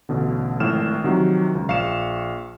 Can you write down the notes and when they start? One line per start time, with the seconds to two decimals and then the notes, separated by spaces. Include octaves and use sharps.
0.09 A1 B2 D3
0.60 G#1 A2 F3 F6 E7
1.04 C3 D#3 F3 F#3 F#4
1.55 C#2
1.68 A#1 F5 C#6 C#7 E7